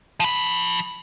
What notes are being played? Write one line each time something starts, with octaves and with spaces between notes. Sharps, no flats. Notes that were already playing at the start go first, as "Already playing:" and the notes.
F3 B5